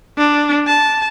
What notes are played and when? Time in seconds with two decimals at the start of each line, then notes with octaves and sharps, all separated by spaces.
0.18 D4
0.67 A5